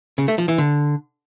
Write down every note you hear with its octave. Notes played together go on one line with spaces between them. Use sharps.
C#3
A3
F3
E3
D3